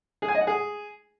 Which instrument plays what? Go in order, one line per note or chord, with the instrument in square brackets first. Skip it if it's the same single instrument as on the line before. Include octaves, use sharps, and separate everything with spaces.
[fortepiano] G#4
G#5
D#5
F#5
G#4